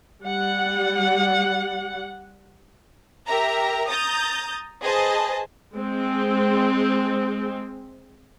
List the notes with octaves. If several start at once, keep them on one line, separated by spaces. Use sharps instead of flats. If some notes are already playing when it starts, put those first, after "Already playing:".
G3 F#5
G4 A#4 E5 A#5
A#5 D#6 G6 A6
G#4 B4 C5 D#5 A5
G#3 C4